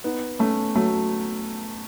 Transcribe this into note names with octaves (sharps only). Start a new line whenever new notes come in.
B3 D#4
A3 C#4
F#3 A3